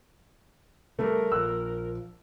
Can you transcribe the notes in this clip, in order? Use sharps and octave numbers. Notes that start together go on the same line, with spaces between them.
C#3 F3 G3 A3 A#4
A#1 F3 E6 F#6